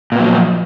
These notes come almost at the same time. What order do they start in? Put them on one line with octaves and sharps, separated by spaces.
A#2 B3 F#3 F3